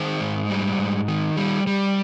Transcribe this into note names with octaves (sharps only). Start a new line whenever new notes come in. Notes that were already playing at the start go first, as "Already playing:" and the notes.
Already playing: D#3 G#4 C5
G#2
G3
G#2
D#3
G3
G3